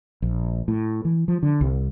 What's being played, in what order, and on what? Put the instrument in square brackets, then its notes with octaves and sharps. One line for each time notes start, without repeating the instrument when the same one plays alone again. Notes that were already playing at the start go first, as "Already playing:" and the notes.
[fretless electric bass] A#1
A2
E3
F3
D3
C2